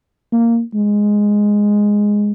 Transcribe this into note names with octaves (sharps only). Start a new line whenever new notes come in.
A#3
G#3